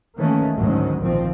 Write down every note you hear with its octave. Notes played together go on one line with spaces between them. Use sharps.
D#3 E3 A3 A#3 C#4
G#1 D2 G#2 D#3 F#3 C#4
A#1 D#3 F3 C4